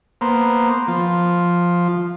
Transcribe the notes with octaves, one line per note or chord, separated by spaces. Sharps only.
A#3 B3 C5
F3